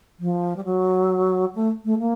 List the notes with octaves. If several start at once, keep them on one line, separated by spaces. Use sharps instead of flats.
F3
G3
F#3
A3
A3
A#3